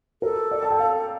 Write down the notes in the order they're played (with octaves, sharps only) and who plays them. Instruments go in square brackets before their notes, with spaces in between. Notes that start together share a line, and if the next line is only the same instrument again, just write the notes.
[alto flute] A4 [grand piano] A#4
[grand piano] D5
A5
G5
F5